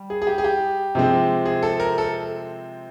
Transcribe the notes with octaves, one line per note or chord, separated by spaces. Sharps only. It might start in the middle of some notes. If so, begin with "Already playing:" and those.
Already playing: G3
G#4
G#4
G4
G#4
G4
C3 F3 G#3 C4
G#4
A4
A#4
A4